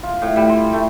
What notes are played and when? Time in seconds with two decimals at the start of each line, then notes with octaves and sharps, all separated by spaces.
0.03 F4
0.22 A2
0.36 G3
0.49 C6
0.73 A3